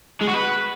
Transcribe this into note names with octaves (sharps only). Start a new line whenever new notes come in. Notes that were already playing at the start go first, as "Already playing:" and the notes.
G#3
F#4
B4